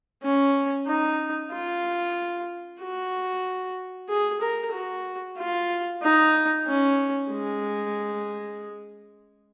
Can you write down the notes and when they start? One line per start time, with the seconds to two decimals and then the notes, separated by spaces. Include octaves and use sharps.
0.23 C#4
0.87 D#4
1.52 F4
2.80 F#4
4.09 G#4
4.41 A#4
4.73 F#4
5.37 F4
6.02 D#4
6.67 C#4
7.30 G#3